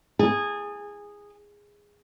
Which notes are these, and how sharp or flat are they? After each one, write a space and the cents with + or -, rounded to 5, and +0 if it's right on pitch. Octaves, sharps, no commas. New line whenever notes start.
G#4 -15 A5 +25